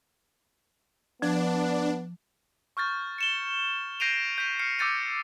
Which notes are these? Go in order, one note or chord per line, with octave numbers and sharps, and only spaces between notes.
F3 B3 D4
C#6 F6 G6 A6
C#7 E7 G7
G6 A#6 C7 D7 D#7 F7
G6 B6 D#7
F6 G6 C7 C#7
D6 E6 G6 A6 C#7 D#7